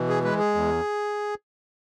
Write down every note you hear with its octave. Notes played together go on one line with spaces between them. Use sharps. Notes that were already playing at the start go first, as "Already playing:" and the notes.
Already playing: B2 E3
G#4
G#3 B4
G#4
E2